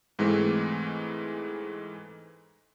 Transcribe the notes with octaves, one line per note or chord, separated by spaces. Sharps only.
G#2 E3 G#3 A3 C4